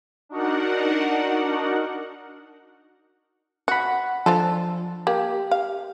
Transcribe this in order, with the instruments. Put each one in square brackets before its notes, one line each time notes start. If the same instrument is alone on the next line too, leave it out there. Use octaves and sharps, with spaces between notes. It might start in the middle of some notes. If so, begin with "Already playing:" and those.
[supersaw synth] D4 D#4 F#4 A#4 F#5
[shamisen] F#4 [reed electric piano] F#5 B5
[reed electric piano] F3 [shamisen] D4 F4 A4
[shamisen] A#3 [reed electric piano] G4
[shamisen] F5